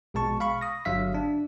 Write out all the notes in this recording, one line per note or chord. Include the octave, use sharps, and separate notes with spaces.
A#1 B2 G#3 A5 C#6
F5 B5 C#6
D#6 A#6
G1 D3 F#3 E5 F5 B6
D4